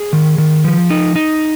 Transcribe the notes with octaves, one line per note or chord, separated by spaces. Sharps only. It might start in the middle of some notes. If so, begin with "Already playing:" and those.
Already playing: G#4
D#3
D#3
F3
D#4
D#4